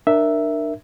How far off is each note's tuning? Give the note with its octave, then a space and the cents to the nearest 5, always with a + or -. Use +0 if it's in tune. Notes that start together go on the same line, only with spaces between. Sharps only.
D4 +30 A#4 +0 E5 +0